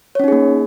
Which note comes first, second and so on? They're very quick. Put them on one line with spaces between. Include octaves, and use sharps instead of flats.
C#5 C#4 D#4 G#4 A#3